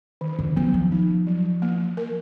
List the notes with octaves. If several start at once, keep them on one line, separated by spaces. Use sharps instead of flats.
D#3
D3
F3 B3
F3
D#4
F#3
A#3
A#4